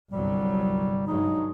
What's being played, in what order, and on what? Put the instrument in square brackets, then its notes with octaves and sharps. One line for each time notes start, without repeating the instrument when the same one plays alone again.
[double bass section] G1 C2 F#3 [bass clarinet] G3
[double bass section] G2 F#3 G#3 [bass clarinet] D#4